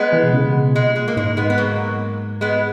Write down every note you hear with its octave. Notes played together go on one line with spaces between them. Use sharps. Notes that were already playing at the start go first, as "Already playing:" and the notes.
Already playing: G#3 B3
E3
B2
C#3
B2
A#2 G#3
G#3
A#3
G#2 G#3
G#3 B3
B3
F#3 A#3
G#3 B3